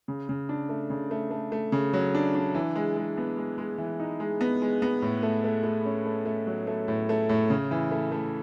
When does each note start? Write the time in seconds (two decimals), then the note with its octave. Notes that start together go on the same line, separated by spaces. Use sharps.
0.08 C#3
0.29 C#3
0.49 D4
0.69 A3
0.90 C#3
1.11 A3
1.31 A3
1.52 A3
1.72 C#3
1.93 F#3
2.14 D4
2.35 D4
2.54 E3
2.76 G#3
2.97 G#3
3.18 B3
3.37 G#3
3.58 G#3
3.78 E3
4.00 D#4
4.20 G#3
4.41 B3
4.62 G#3
4.82 B3
5.02 A2
5.23 A3
5.44 A3
5.64 A3
5.85 C#4
6.06 A3
6.26 A3
6.47 F#3
6.67 A3
6.88 A2
7.09 A3
7.29 A2
7.50 C#3
7.71 E3
7.91 A3
8.12 A3